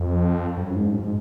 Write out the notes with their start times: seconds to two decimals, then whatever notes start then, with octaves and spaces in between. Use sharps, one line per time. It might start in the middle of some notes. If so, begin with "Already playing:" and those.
Already playing: F2
0.57 F#2
0.76 G#2
0.94 G#2